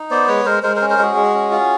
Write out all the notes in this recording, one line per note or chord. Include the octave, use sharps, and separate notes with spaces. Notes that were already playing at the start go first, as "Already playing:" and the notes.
Already playing: D#4
B3 C5 D5
G#3 B4 C#5
G#3 A#4 C5
G#3 A#4 C5
A#4 C5
C#4
A#4 C5
G#3 F#4 G#4
G#3
C#4
F4